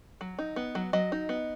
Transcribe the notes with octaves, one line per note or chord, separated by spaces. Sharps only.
F#3
D#4
B3
F#3
F#3 D#5
D#4
B3